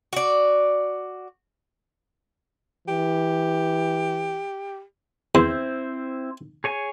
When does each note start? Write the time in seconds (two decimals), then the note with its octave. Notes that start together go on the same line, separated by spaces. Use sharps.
0.13 F#4 D5
2.88 E3 G4
5.35 E2 C4 E4 C5
6.64 G#4 C#5 G#5